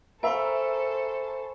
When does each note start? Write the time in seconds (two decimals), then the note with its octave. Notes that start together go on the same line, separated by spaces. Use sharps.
0.23 A4 A#4 C5 E5 G#5 B5 C#6